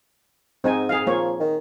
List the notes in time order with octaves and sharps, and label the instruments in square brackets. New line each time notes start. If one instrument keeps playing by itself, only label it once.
[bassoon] G#2 [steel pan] C4 D#4 G#5
[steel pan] G#4 F5
[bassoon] F3 [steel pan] A#3 C#5
[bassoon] D#3